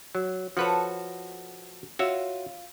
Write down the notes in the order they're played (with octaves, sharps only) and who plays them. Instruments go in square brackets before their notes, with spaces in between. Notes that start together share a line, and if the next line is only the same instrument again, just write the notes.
[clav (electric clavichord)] F#3
[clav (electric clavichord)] F3 B4 C#5 [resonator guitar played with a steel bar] F#4 A4
[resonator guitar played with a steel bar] F4 [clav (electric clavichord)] F#4 C#5 E5